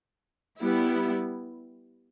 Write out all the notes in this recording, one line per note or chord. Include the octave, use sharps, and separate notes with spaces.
G3 B3 E4